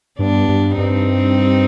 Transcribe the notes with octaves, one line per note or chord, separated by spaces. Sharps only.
G2 B3 D4
G2
G2 C4 D#4